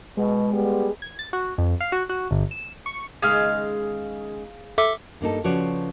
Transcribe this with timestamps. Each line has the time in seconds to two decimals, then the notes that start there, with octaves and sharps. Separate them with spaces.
0.17 B2 G#3
0.52 G3 B3
1.02 G#6
1.19 A6
1.33 F#4
1.58 F2
1.81 F5
1.92 F#4
2.09 F#4
2.31 G1
2.51 E7
2.86 C#6
3.22 D#2 C#3 G#3 G#4 F5 F6
4.78 A4 E5 D6
5.21 G2 A#3 D#4 A4
5.44 C#3 F3 F#4 B4 C#5 D5